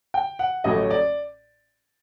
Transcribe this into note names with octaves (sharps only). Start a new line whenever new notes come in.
G5
F#5
A1 A2 F#3 A3 D#5
D5